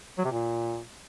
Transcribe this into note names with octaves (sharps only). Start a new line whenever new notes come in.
F#3
C3
A#2